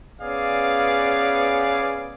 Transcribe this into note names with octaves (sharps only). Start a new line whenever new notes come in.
B3 C#4 G#4 D5 F5